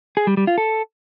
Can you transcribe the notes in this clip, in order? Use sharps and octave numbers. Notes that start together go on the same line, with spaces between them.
G#4
G3
G3
F4
A4